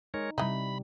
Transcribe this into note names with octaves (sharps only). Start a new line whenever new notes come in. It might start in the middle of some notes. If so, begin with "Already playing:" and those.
G#3 D#4 A#4 C#5
C3 E3 G3 D#4 B5